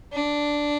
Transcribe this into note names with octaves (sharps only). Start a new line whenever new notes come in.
D4